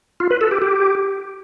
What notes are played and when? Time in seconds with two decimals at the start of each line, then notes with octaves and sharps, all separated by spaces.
0.20 F4
0.31 B4
0.41 A4
0.51 G4
0.62 G4